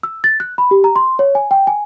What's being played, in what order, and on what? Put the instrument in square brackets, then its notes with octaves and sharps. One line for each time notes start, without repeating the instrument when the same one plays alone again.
[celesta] E6
A6
F#6
B5
G4
A#5
C6
C#5
G#5
G5
G#5